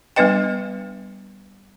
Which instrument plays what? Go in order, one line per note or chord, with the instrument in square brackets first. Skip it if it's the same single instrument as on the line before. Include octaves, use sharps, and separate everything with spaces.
[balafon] G3 B3 D4 B4 D#5 G5